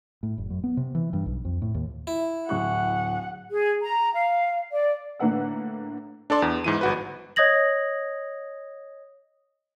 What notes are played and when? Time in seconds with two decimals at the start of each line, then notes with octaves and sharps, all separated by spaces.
0.23 A2
0.38 F#1
0.50 F#2
0.64 B3
0.77 C3
0.95 E3
1.13 G2
1.26 B1
1.45 F2
1.62 A2
1.75 D#2
2.07 E4
2.49 D1 F#5 C#6 F#6
3.52 G#4
3.83 A#5
4.14 F5
4.72 D5
5.20 A2 D3 A#3 B4 F#5 E6
6.30 D4 A4 D5 C6
6.42 E2
6.64 G#2 E3 D#7
6.81 G1 F#4 B4
7.36 C#5 D#5 D#6 G#6 A#6 F#7